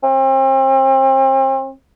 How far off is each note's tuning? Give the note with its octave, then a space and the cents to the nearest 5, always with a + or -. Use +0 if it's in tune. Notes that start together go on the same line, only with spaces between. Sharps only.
C4 +40